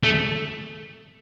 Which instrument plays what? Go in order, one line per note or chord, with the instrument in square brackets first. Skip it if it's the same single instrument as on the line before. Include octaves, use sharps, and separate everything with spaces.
[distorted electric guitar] A3